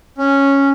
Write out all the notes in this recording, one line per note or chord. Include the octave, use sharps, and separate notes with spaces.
C#4